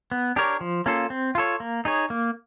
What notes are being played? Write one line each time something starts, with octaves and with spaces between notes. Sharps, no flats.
B3
D4 G4 A#4 C#5
F3
A#3 C#4 F4 A4
C4
F4 A4 C#5
A#3
D#4 G#4 C#5
A#3